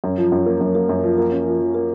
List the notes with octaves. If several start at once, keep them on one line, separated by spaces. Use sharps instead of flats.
F#2
F3
F#2
A#3
F#2
A#3
F#2
F3
A#3
C#4
F3
F3
A#3